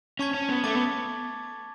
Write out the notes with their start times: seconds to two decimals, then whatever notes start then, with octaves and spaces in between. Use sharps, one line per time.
0.19 C#4 A5 C#6 G#6 B6
0.34 C#4
0.49 B3
0.64 A3 A5 D6 A6
0.75 B3